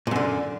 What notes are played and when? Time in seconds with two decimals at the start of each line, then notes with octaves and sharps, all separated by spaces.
0.07 A#2
0.11 F#2
0.16 D3